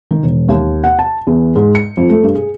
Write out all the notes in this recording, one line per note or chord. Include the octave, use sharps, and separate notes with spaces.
D#3
E1
D#2
F#5
A5
E2
G#2
C#7
F2
A3
G2
G#4